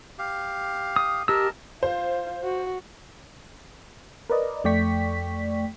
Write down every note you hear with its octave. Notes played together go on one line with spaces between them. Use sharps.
G4 F5
D#6
G4 A#4 D#5 A5 E6
F4 C5
F#4
A#4 B4 D5 D#5
F2 A3 D5 G5 C#6 B6